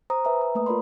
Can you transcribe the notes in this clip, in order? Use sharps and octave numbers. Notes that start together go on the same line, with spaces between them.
C5 A#5 D#6
B4 E5 G#5 A#5
A#5
A3 A#3 B4 D#6
F4 A#4 D5 B5 C6